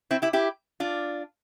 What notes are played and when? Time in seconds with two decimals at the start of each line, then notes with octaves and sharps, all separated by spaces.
0.11 C4 E4
0.22 E4 G4
0.33 E4 G4
0.80 D4 F4